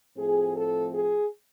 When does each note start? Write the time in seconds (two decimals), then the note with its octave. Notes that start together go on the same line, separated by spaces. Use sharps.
0.16 A2 F3 A3 C4 G#4
0.54 A4
0.92 G#4